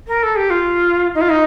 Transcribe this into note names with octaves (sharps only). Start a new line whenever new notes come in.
A#4
A4
G4
F4
D#4
F4
D#4